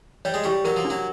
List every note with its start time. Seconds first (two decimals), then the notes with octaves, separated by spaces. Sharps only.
0.25 G3 C#5
0.34 G#3
0.44 G3 G4
0.64 F#3 A#4
0.77 F3
0.85 D4
0.90 F#3